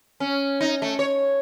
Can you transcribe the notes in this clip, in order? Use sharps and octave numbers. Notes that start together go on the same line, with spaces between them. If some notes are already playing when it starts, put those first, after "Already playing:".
C#4
D#4
A3
C#5